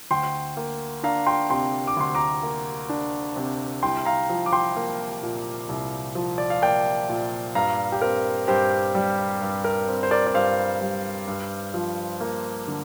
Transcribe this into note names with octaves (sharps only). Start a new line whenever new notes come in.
D2 G5 C6
A#3
D4 F5 A#5
G5 C6
C3 G5 C6
D6
D2 C6
A#5 D6
A#3
D4
C3
C2 G5 C6
F5 A#5
F3
D6
G5 C6
A#3
A#2
C2
F3
D5
F5
A#3 D5 G5
A#2
G2 F5 A#5
G4
C4 A#4
G2 G4 C5
G3
G2
A#4
C4
C5
A#4 D5
D5
G2 C5 F5
G3
G2
F3
A#3
D3